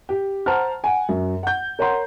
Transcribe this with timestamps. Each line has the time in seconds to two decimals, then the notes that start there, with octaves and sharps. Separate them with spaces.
0.09 G4
0.46 C5 F#5 A5 A#5 F6
0.84 F#5 G#5
1.09 F#2
1.43 F#5 G6
1.79 A#4 C#5 F#5 A#5 C6